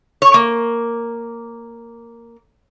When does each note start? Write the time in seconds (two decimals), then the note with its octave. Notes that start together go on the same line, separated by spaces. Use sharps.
0.22 C#5
0.34 A#3